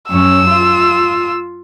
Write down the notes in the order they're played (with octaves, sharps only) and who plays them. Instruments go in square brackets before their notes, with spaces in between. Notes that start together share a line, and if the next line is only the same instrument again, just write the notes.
[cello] F#2 C#4 [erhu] E6
[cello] F4